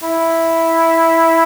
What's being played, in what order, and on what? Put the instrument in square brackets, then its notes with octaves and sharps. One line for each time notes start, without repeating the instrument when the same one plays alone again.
[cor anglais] E4